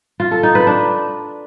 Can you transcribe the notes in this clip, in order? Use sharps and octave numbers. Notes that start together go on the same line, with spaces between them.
F4
A4
D#4
B4
D4